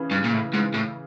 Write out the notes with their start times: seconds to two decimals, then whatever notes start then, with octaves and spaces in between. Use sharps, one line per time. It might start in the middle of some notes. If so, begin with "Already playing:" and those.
Already playing: C#3 E3
0.11 G2
0.24 A#2
0.33 A2
0.54 G#2
0.74 A2